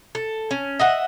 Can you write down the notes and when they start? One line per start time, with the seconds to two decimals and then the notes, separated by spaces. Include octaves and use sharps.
0.15 A4
0.51 C#4
0.79 D#5 E5 F#5